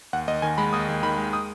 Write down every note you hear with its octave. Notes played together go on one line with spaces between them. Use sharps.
D#2 F#5
D#2 D#5
D#3 G#5
G#3 B5
D#2 D#6
D#2
D#3 B5
G#3
D#6